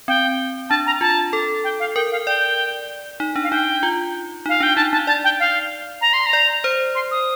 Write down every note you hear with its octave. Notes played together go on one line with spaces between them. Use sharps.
C4 G5
D4 A5
A#5
F4 A5
A4
G5
F5
A#4 G5
F5
D5 G5
D#4
D4
F5
D#4 G5
F4
D#4 F5
D4 G5
D#4 A5
D#4 A5
D5 A5
G5
F5
A#5
C6
A#5
D5
C5
C6
D#6